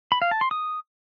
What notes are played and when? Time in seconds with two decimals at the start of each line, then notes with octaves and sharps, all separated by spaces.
0.12 B5
0.22 F5
0.31 A5
0.41 C6
0.51 D#6